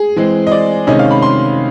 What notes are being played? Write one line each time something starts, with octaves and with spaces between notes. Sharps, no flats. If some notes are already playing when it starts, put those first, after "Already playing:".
Already playing: G#4
E3 G#3 C4
D#5
D5
C3 D#3 G#3 C#4 D#5
F5
B5
C6